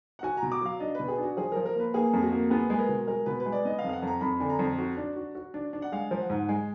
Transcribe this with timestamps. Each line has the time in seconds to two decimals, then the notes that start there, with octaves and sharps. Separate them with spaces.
0.19 F#5
0.23 F#4 G#5
0.37 A#5
0.42 B2
0.52 D6
0.61 F#3 F5
0.80 D4 D#5
0.95 B2 B4
1.08 G#4
1.18 D4 F#4
1.37 F3 G#4
1.52 F3 A#4
1.66 A#4
1.75 A#3 B4
1.94 A#3 G#4
2.13 F2
2.22 F#4
2.32 A#3
2.50 B3 G#4
2.70 G#3 B4
2.79 A#4
2.89 B2
3.07 G#3 A#4
3.26 B2 B4
3.40 B4
3.46 G#3
3.52 D5
3.65 B3 D#5
3.79 F5
3.84 F2
3.89 F5
3.93 F#5
4.02 F2
4.07 A#5
4.21 F2 B5
4.40 D3 G#5
4.49 A#5
4.59 F2
4.79 F#4
4.97 D4
5.16 F#4
5.35 F#4
5.54 D4
5.73 D4
5.82 F#5
5.92 G#3 F5
6.11 F3
6.20 F#5
6.30 G#2
6.49 G#3 G#5